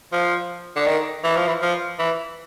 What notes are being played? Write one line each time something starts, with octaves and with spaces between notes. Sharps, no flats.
F3
D3
D#3
E3
F3
E3
F3
E3